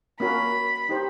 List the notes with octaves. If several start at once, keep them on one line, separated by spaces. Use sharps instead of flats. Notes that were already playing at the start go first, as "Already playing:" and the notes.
A#3 C#4 F#4 A#4 B5
D#4 G4 C5